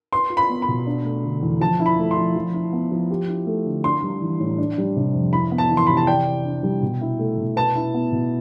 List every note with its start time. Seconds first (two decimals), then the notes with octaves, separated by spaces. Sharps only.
0.12 B4 C6
0.30 F4
0.37 B5
0.49 B3
0.62 B5
0.68 B2
0.86 D4
1.04 A3
1.23 D3
1.42 E2
1.61 F3 A5
1.80 E4
1.86 B5
1.99 A3
2.11 C6
2.17 F3
2.36 F3
2.54 E4
2.73 B3
2.91 F3
3.10 G4
3.28 E4
3.47 A3
3.65 D3
3.84 D4 C6
4.03 G3
4.22 E3
4.40 A2
4.58 D4
4.78 G3
4.96 C3
5.14 F2
5.32 E4 B5
5.51 B3
5.58 A5
5.71 E3
5.77 C6
5.87 C3 B5
5.97 A5
6.07 D5 G5
6.27 G4
6.44 D4
6.63 G3
6.82 B2
7.01 E4
7.19 A3
7.38 B2
7.56 B4 A5
7.75 E4
7.94 B3
8.12 B2